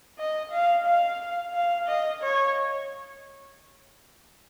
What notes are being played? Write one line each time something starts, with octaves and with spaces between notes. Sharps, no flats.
D#5
F5
F5
F5
D#5
C#5